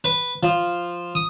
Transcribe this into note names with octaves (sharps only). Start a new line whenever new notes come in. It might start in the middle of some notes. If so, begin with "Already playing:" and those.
B4
F3
D#6